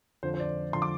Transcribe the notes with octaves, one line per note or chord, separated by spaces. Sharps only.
F2 D3 F3 C5
C5
D5
D3 F3 C6
D6